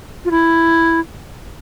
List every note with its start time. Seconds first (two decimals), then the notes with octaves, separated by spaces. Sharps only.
0.25 F4
0.31 E4